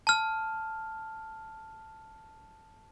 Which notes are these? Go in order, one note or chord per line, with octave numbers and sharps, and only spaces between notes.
A5 F6